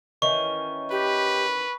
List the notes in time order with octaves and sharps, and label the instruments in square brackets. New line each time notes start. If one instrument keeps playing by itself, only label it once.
[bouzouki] D#3 E3 C#4 [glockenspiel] C#6
[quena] G4 [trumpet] B4